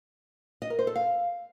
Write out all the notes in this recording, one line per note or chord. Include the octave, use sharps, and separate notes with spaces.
D#5
A#4
C5
A4
F5